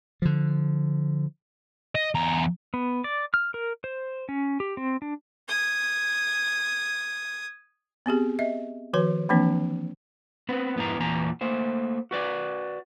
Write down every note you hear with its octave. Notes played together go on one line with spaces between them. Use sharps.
D3 F3
D#5
E2 A#5
B3
D5
F6
A#4
C5
C#4
G4
C4
D4
D#6 G#6
B3 C4 G4 G#4
D#5 E5
D#3 F3 F#4 B4 C#5
E3 F3 A#3 C4 D4
B3 C4 B4
F2 G#2 B3 D#4 E4 A#5
E2 A#2 E3 G#5 A#5
A3 A#3 C5
F#4 B4 D5